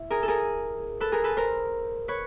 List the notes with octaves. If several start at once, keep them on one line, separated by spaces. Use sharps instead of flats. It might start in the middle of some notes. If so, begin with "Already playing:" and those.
Already playing: E4
G#4 A#4
A4
G#4 A#4
A4 B4
G#4 A#4
A4 B4
A#4 C5
B4 C#5